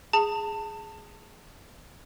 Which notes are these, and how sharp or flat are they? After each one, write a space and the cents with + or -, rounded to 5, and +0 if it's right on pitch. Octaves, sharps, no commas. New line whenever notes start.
G#4 +0 A5 +25